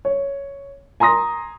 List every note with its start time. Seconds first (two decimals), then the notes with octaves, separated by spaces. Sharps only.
0.05 C#5
1.00 G#5 A#5 C6 D#6 A#6